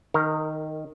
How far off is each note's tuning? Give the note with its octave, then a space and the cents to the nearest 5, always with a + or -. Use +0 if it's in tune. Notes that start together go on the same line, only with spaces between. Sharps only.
D#3 +0 A#4 -25